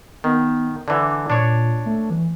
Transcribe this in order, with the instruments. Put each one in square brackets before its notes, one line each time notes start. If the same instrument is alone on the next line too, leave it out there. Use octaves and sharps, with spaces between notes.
[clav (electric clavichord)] D#3 [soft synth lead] B3
[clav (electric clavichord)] D3 E3 [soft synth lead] D6
[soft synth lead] A#2 [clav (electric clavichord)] D4 C#5
[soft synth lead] A3
E3